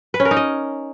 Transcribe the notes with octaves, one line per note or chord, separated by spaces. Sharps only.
B4
C#4
A#4
D#4
D#5